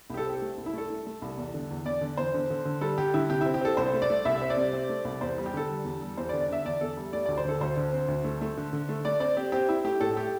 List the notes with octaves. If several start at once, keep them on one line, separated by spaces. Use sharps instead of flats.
C2 G4
A4
C4 G4
A3
C2
E4
A3 A4
A3
A3
C2
E2
D3
E2
E2 D5
D3
E2 C5
D3
D3
D3
G3 A4
D3 G4
D3 E4
C3 G4
C4 E4
G4
C4 A4
C2 C5
A3
D5
A3
C2 E5
C4
D5
C3
C4
A3
C2
E2 C5
G3
G4
D3 A4
G3
E2
G3
E2 C5
D5
D3
D5
D3 E5
E2 D5
E2 A4
G3
A3 D5
D2 D5
C5
D3 A4
D2 C5
D3
C4
D2
A3
A3
D3
D3
A3
A3 D5
C4 D5
C4 G4
C4 G4
C4 E4
A3 G4
A2 A4
A3 G4